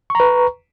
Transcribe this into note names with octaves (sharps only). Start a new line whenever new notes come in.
B4 A#5 C#6